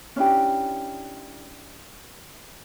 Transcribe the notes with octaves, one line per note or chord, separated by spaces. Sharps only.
C#4 D4 E4 G4